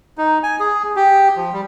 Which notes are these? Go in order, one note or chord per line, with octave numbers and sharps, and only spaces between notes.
D#4
G#5
G#4
G4
F3
G3